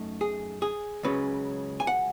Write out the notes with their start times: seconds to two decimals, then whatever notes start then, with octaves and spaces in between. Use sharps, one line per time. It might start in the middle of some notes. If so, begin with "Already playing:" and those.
Already playing: F#2 A3 D#4
0.21 G#4
0.62 G#4
1.03 C#2 C#3 F#3 C#4 B4
1.80 G#5
1.87 F#5